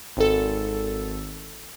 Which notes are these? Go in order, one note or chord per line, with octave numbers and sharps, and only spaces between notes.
G#1 A4